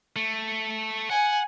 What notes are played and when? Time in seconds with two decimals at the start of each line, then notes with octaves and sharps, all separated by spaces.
0.16 A3
1.10 F#5 G#5